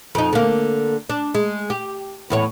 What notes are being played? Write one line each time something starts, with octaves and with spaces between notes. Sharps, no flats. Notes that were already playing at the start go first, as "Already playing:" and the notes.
F2 D#4
D3 A#3
D4
G#3
G4
E2 A2 C#5